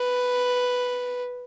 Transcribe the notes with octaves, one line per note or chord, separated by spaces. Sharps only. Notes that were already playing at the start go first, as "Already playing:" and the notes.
Already playing: B4